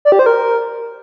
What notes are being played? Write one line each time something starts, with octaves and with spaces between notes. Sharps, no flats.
D5
G4
C5
A#4